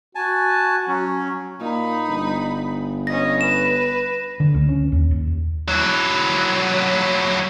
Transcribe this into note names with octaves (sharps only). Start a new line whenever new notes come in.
F#4 G#5 A5
F#3 C#4
A#2 D#4 B5
G1
C#4 D#5 A#6
B4 E7
D3
D2
C#4
D#2
D#2
F#3 E4